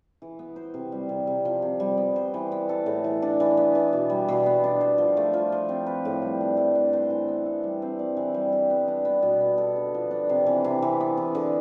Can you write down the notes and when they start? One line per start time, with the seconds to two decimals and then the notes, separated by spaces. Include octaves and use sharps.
0.22 E3
0.39 B3
0.56 C5
0.74 C3
0.92 G3
1.09 C3
1.27 C3
1.45 F3
1.62 C3
1.80 G3
1.97 B3
2.16 C5
2.34 E3
2.52 B3
2.69 A4
2.86 A2
3.04 E3
3.22 D4
3.40 E3
3.57 B3
3.75 E3
3.93 B2
4.10 G3
4.28 B2
4.46 B3
4.64 D4
4.81 C5
4.98 F3
5.17 A3
5.33 F3
5.52 F3
5.69 C4
5.86 B4
6.05 A2
6.22 G3
6.41 D4
6.57 A3
6.75 D4
6.93 C5
7.10 E3
7.28 B3
7.46 A4
7.63 G3
7.82 C4
7.99 D5
8.17 E3
8.34 G3
8.52 G4
8.70 B3
8.88 D4
9.05 B3
9.23 B2
9.40 B3
9.58 A4
9.76 D3
9.94 F3
10.11 D4
10.29 C3
10.46 E3
10.64 C3
10.82 E3
11.00 B3
11.17 E3
11.35 D3